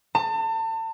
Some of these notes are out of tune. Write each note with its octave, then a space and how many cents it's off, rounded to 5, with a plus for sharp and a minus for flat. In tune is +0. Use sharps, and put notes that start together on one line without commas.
A5 +35